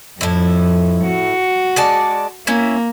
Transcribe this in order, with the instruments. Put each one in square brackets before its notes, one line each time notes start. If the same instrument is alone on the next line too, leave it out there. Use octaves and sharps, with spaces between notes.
[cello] F2 [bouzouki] A2 E4
[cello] F#4
[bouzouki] G#3 D5 A5
[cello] A#3 [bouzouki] C#4 E4